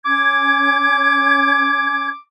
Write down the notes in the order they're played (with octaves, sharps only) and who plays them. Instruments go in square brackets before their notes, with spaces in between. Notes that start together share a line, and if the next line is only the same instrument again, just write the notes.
[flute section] C#4 G#6 [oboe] D6